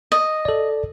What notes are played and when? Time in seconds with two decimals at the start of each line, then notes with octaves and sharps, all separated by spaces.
0.12 D#5
0.45 A4 D5